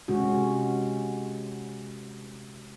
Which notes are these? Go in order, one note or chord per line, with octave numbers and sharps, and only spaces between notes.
C3 G#3 C#4 F#4